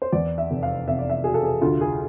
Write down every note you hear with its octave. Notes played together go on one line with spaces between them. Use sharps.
C5
E2 D5
E5
F1
F5
F1 E5
D5
E5
B2 G#4
A4
G#4
D2 F4
G#4